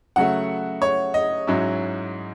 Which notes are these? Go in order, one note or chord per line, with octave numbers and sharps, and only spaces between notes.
C#3 F#3 A3 F#5
C#5
D#5
G#2 F#3 C#4 E4